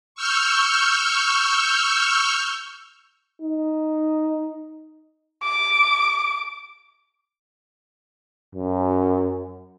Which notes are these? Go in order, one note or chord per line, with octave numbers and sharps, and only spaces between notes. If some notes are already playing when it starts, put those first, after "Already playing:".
C#6 E6 F6 G6
D#4
D6
F#2